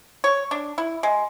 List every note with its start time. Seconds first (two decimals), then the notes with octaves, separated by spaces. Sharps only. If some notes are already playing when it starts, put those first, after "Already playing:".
0.24 C#5
0.51 D4
0.78 E4
1.03 G#3